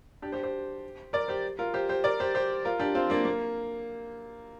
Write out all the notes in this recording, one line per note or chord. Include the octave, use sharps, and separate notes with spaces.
D4 G4
G4 C5
G4 C5
A#4 D5
G4 C5
F4 A#4
G4 C5
G4 C5
A#4 D5
G4 C5
G4 C5
F4 A#4
D4 G4
C4 F4
A#3 D4
A#3